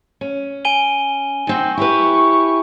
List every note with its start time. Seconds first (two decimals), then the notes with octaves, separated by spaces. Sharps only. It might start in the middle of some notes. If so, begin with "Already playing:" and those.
0.21 C#4
0.65 G#5 D#7 G7
1.47 D#3 C4 F#4
1.77 E4 G4 B4 C#6